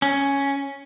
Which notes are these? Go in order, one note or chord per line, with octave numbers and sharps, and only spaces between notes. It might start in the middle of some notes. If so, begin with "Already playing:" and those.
C#4